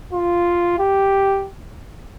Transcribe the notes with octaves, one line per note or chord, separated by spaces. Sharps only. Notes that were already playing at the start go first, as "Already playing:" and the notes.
F4
G4